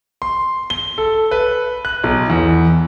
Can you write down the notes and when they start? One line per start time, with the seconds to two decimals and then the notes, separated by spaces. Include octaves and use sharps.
0.22 C6
0.70 G7
0.98 A4
1.31 B4
1.85 F#6
2.04 B1
2.30 E2